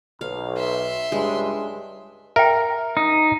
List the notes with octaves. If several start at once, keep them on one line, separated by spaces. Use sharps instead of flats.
B1 F5
E5 C6
C#2 G2 G#3
A#4 E5 G5
D#4